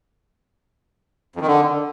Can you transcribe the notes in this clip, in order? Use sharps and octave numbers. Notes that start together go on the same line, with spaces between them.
F2
D#3
D3